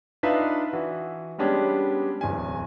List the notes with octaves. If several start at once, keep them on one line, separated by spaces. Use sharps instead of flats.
D4 D#4 F4 B4 E5 F5
E3 F#4
G3 G#3 B3 C#4 D4 G4
D1 E2 G#5